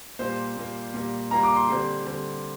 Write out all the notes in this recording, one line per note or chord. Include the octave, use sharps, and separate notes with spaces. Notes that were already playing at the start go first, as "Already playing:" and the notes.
A#2 G3 A#3 C5
A#2 G3 A#3
A#2 G3 A#3
A#2 G3 A#3 A#5
D6
C6
D3 G3 C4
D3 G3 C4